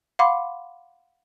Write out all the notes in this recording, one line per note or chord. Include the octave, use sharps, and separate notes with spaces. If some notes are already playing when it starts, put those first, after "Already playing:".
F5 F#5 B5 C6 D6